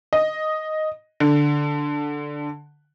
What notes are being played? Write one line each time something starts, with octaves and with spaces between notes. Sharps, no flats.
D#5
D3